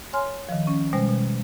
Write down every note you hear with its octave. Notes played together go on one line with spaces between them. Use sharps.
C#5 G#5 C6 F6
D#3 F3
C#4
B2 G3 G#3 C5
B2